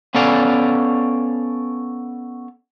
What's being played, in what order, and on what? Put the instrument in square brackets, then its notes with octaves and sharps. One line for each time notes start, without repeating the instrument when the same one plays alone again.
[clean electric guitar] B3 C#4 A4 D5 F5